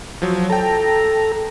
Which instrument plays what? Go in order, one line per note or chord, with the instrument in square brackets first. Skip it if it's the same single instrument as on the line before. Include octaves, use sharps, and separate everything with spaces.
[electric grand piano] F3 F#3
[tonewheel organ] A4 A#5 [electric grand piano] G5 A5